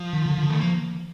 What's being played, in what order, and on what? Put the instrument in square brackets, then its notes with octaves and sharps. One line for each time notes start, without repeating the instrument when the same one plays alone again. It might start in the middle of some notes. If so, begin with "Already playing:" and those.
Already playing: [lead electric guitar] F3
[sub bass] D#3
D3
D3
[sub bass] D#3 [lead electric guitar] A3
[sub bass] F3 [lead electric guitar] A#3